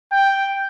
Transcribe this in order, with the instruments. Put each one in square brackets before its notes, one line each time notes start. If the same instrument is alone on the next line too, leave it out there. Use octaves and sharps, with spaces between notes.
[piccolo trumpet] G5